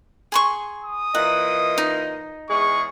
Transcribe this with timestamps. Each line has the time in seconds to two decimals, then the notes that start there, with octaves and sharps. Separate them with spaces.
0.32 G#4 C6 C#6
0.84 D#6
1.15 A#2 E3 D#5 F#5
1.78 D#4
2.50 E2 G#3 G#4 C#6